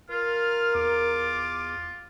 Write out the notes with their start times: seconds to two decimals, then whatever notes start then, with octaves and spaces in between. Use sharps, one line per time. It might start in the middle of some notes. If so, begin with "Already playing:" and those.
0.10 F4 A#4 F6
0.75 E2 D6